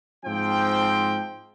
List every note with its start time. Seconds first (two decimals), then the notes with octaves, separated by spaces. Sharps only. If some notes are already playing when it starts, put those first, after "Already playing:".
0.25 G#2 F3 C4 G5